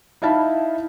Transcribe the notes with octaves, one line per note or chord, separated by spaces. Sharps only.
D#4 E4 F5 A5 B5